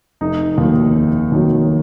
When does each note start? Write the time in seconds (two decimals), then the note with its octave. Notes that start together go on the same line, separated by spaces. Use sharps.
0.21 F1 D#4
0.58 D#2 D#3 F#3
0.95 F1
1.32 D#2 D#3 F#3